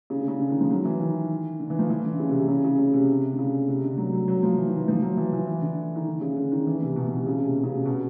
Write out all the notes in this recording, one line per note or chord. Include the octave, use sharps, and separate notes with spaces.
C#3
D3
C#3
D3
D#3
F3
F#3
E3
D#3
D3
E3
F3
E3
D3
D3
C#3
C3
C3
C#3
C#3
C#3
C3
C3
D3
C#3
C3
D3
F#3
F#3
F#3
F3
E3
D#3
E3
F3
F#3
E3
E3
E3
D3
D#3
D3
C#3
D3
D#3
E3
C3
B2
B2
C3
C#3
C3
B2
C#3
C3
B2